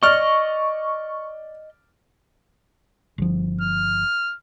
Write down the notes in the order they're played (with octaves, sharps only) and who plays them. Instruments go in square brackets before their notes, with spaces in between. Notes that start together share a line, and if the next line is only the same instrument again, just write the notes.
[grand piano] D5 F6 [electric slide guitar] D#5 [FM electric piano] C#6
[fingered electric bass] G1 F3
[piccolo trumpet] F6